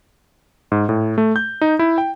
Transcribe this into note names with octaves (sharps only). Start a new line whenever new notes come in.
G#2
A2
A3
G6
D#4
E4
G5